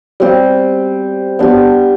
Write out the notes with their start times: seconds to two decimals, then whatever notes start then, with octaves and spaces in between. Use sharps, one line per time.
0.20 G3 C4 G4
1.39 B3 D4 G4